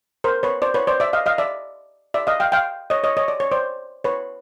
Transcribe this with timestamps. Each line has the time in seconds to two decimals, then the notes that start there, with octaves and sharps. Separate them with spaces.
0.24 A#4 C5
0.43 B4 C#5
0.62 C5 D5
0.74 B4 C#5
0.87 C5 D5
1.00 D5 E5
1.13 D#5 F5
1.26 D#5 F5
1.38 D5 E5
2.14 D5 E5
2.27 D#5 F5
2.40 F5 G5
2.52 F5 G5
2.90 C#5 D#5
3.04 C#5 D#5
3.17 C#5 D#5
3.28 D5
3.40 C#5
3.52 C5 D5
4.04 B4 C#5